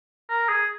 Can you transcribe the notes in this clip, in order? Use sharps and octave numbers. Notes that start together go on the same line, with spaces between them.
A#4
G#4